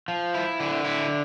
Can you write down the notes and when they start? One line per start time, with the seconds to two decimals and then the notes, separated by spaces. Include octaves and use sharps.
0.08 F3
0.34 E4
0.60 D3
0.84 E4